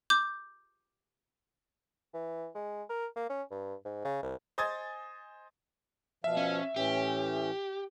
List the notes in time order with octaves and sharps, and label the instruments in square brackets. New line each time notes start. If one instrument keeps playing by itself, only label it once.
[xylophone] D6 G6
[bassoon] E3
G#3
A#4
A#3
C#4
G2
G#2
C#3
C2
[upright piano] C5 D#5 G#5 D#6 G#6 A6
[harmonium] B2 F3 F5 [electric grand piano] E5
[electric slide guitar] C#4
[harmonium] A2 E3 C#4 [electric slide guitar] G4